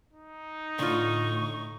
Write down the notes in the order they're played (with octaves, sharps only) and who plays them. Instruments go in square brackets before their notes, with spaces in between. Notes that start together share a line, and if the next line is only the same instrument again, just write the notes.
[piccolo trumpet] D#4
[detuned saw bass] A2 [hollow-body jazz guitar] D3 F4 [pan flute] C#6